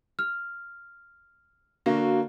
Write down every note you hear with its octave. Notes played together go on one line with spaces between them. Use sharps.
F6
D3 A#3 F#4 F5